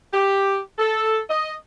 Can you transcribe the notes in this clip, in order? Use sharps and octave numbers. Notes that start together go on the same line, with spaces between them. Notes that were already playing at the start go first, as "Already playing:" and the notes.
G4
A4
D#5